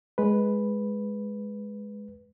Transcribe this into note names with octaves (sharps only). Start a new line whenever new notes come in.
G#3 B4